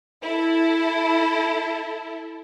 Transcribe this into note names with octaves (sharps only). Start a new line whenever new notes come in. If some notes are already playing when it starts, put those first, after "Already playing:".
E4 A4